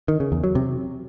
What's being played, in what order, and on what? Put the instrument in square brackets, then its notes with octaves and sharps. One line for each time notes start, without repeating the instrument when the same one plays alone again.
[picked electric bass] D#3
C#3
E2
F#3
C3